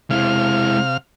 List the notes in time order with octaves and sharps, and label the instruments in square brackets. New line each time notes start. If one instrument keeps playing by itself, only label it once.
[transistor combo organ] C3 F5 F6 [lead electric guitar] G#3 E4